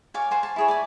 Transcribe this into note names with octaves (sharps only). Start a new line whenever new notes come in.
C#5 D5 F5 G#5
C5 D5 F#5 G#5
A5
E4 G#4 C#5
D5 E5 G#5